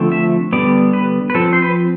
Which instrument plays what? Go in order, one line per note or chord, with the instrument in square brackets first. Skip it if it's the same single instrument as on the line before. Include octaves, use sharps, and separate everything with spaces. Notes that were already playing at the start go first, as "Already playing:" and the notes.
Already playing: [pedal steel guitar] D3 F3 A3 C4
E5
D3 G3 B3 D5
B4
B4
F3 C4 A4
C5
B4